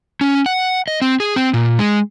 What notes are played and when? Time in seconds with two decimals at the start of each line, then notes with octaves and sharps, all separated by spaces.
0.21 C#4
0.46 F#5
0.88 D#5
1.02 C4
1.20 G#4
1.36 C4
1.54 A#2
1.79 G#3